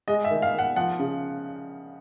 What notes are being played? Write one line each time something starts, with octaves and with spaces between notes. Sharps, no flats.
G#3 D#5
E5
D#3
F5
D#3
F#5
F3 F#5
C#3